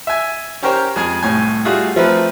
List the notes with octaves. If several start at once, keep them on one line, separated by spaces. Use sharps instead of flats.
E5 G#5
C#4 G4 A#4 C5 C#5 G5
F2 G#3 G#4 G#5
C2 A2 G#5
G3 A3 F4 F#4 G#4
F3 A3 C4 A#4 B4